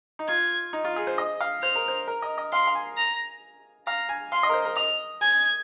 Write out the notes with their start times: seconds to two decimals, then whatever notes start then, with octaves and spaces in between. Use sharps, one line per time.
0.19 D#4
0.28 F4 G#6
0.73 D#4
0.84 F4
0.96 G#4
1.07 C5
1.18 D#5
1.41 F5
1.62 C5 F6
1.76 A#4
1.88 C5
2.08 A#4
2.22 D#5
2.38 D#5
2.53 F5 C6
2.67 F5
2.75 G#5
2.97 A#5
3.87 F5 A#5
4.09 G#5
4.32 F5 C6
4.43 D#5
4.49 A#4
4.54 C5
4.65 A#4
4.76 D#5 F6
5.21 G#5 G#6